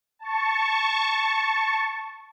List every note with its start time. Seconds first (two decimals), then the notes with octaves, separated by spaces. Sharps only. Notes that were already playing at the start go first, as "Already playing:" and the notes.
0.19 A5 C#6